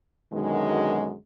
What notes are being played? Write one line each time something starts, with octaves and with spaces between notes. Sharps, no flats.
F#2 B2 D3 D#3 G#3